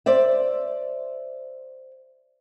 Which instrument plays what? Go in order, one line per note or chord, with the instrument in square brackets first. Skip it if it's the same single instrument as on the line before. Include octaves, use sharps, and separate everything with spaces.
[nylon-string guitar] C5 D5 E5